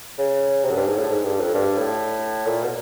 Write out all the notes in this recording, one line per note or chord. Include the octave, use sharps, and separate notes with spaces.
C#3
C3
F#2
G2
G#2
A2
G#2
G2
F2
G2
A2
A#2
B2